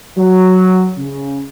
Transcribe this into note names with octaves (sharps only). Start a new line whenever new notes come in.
F#3
C#3